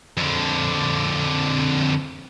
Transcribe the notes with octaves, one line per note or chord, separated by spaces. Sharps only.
F2 D3